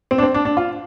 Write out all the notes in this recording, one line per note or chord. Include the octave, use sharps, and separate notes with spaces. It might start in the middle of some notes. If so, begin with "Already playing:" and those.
C4
D4
C4
D4
D4
F4